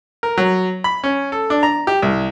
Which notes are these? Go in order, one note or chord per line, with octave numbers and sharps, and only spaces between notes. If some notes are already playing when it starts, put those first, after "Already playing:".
A#4
F#3
B5
C#4
A4
D4
A#5
G4
C2